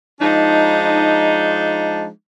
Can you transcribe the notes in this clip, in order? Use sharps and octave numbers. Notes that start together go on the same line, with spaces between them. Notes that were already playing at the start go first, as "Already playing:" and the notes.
F3 G#3 D4 D#4